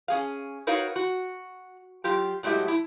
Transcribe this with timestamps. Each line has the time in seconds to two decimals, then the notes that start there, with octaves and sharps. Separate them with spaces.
0.08 C#4 G#4 F5
0.67 D#4 F#4 A#4 B4 C#5 F5
0.96 F#4
2.04 F#3 F4 G4
2.43 A2 F#3 G#3 G4 E5
2.68 E4